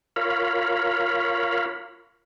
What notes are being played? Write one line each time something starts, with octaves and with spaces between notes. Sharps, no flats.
F4 A#4 C#5 F5 B5